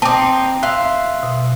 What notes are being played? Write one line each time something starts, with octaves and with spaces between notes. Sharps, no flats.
C4 D#4 G5 A5 D6
E5 F5 C6 F#6
B2